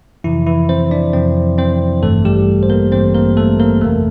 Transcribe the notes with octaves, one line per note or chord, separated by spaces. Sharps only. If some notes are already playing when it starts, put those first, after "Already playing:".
F2 C3 E3 F3 E4
E3 E4
C4 C5
D4 D5
F2 C3 F3 C4 C5
C4 C5
A1 G2 E3 A3 A4
G3 G4
C5
A#3 A#4
A1 G2 E3 C4 C5
A#3 A#4
A3 A4
A#3 A#4
G1 F2 C3 E3 A3 A4